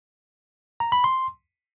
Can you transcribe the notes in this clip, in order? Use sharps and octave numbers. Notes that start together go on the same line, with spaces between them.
A#5
B5
C6